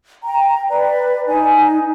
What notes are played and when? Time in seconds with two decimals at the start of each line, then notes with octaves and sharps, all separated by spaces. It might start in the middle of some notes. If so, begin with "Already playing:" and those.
0.23 G5 A#5
0.68 B4 D5
1.26 D#4 G#5